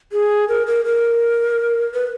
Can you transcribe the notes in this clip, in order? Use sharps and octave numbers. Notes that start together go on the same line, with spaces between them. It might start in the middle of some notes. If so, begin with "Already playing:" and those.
G#4
A#4
A#4
A#4
B4